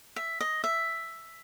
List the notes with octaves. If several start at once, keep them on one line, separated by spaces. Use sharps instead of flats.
E5
D#5
E5